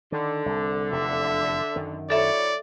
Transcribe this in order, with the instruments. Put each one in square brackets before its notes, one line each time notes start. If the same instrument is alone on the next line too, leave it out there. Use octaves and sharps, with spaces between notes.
[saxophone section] D3 [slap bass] D#3
[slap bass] C2
[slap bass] F1 E2 C3 [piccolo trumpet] E5
[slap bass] F#2 D#3
[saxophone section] F#3 E4 C#5 [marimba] A4 E5 [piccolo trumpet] D5